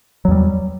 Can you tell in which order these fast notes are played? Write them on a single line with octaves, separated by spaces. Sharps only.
F#3 E2 G3